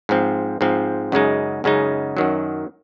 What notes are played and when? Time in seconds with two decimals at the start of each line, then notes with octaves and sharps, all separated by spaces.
0.09 G#2 F3 C4
0.61 G#2 F3 C4
1.12 F#2 C#3 G#3 D#4
1.64 F#2 C#3 G#3 D#4
2.17 F#2 D#3 F#3